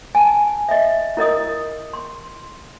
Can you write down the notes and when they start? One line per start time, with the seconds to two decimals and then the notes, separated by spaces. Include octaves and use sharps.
0.15 G#5 A5
0.69 D#5 E5
1.17 E4 A#4 D#5 D#6
1.93 C6